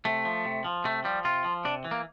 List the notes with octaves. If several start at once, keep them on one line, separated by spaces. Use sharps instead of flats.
C3 A3
F3
C3
F3
C3 A3
F3 G3
C3 F4
F3
C3 D4
E3
A#3